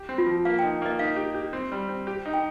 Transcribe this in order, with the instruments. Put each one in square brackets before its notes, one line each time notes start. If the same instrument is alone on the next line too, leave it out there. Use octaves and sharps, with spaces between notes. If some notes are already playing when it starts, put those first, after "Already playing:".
Already playing: [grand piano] G4
C4
[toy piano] F4
[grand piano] F3
[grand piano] A#3 [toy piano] F5
[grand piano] D#4 [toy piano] G5
[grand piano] A#3 [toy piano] D#5
[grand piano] D#4 [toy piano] F5
[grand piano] G4
G4
C4
G3
C4
G4
D#4
[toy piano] G5